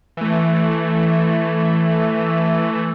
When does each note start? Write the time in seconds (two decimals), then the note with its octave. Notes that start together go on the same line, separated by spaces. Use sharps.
0.17 E3 A3